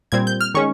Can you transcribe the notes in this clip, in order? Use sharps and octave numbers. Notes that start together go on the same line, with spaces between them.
A#2 G3 C4 G#6
G6
F6
D#3 G#3 C#4 C#6